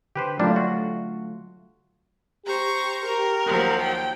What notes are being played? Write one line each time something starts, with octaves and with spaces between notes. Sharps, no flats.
D3 G4 B4 C5
F#3 G3 A3 A#3 D4 F4
F#4
G4 C5 A#5 C#6
G4 A#4
D#2 F3 F#3
G5